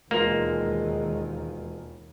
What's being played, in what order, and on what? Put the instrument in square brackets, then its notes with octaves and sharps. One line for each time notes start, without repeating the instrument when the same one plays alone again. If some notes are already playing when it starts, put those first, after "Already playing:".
[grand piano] E1 F4 C6 [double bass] D#2 D#3 [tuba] G#3 [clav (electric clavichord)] A#3